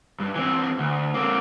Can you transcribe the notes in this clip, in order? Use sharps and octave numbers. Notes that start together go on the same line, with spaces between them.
G2
E3 C4
D2
A#3 C4